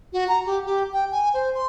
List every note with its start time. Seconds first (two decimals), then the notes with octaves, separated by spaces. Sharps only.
0.13 F#4
0.28 A#5
0.46 G4
0.66 G4
0.93 G5
1.12 G#5
1.34 C5
1.55 C6